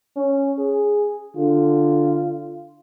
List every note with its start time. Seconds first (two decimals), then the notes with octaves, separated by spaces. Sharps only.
0.16 C#4
0.58 G#4
1.36 D3 F4